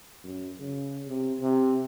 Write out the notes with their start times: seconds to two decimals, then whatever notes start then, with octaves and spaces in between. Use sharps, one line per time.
0.23 F#2
0.59 C#3
1.07 C3
1.39 C3